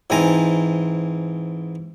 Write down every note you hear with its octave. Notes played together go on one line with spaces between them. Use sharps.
G#2 E3 C4 G#5 A#5